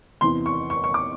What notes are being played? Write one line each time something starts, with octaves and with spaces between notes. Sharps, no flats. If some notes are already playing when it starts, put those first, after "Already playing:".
E2 C3 E3 C6
C#6
C#6
C#6
D6